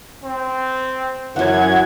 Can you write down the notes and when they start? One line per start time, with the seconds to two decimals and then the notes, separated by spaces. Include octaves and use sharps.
0.24 C4
1.36 F#2 E3 F#3 F#5 G#6